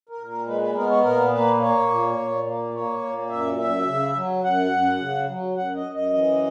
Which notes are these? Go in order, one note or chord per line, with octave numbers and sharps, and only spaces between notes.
A#4
A#2
A#4
G#3 B4
B4
B3 A#4
C#5
A#2 A#4
A#3 B4
A#3 C#5
A#2
A#2
A#3
A#3 C#5
A#2
F#2 E5
F#2 E5
C#3
F#3
F#2 F#5
F#2
C#3
F#3
F#2 F#5
D#5
F#2
D#5
E3